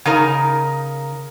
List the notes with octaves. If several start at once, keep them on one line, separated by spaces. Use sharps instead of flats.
C#3 D#4 A#4